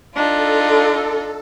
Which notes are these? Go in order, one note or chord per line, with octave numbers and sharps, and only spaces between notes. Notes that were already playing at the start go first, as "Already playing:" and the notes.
D4 D#4 F4 A4